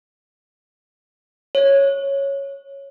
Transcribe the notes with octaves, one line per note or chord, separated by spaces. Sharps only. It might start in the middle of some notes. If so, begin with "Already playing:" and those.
C#5